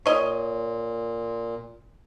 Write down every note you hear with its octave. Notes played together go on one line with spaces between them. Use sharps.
A#2 C#5 D#5